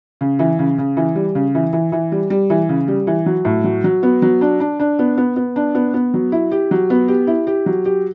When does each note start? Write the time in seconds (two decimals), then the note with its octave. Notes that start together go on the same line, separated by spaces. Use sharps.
0.21 C#3
0.39 E3
0.59 C#3
0.78 C#3
0.97 E3
1.15 G3
1.35 C#3
1.55 E3
1.73 E3
1.92 E3
2.12 G3
2.30 G3
2.50 E3
2.69 C#3
2.88 G3
3.07 E3
3.26 F#3
3.45 A2
3.64 F#3
3.84 F#3
4.03 B3
4.22 F#3
4.41 D4
4.60 D4
4.80 D4
4.99 B3
5.17 B3
5.36 B3
5.56 D4
5.75 B3
5.94 B3
6.14 F#3
6.32 E4
6.51 G4
6.71 F#3
6.90 B3
7.08 G4
7.27 E4
7.47 G4
7.66 F#3
7.85 G4